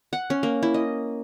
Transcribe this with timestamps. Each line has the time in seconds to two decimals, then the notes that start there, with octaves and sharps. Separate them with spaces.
0.13 F#5
0.30 C#4
0.43 A#3
0.63 E4
0.74 D#5